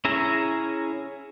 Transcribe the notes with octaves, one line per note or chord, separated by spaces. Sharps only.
C#4 E4 G#4 E5 A#5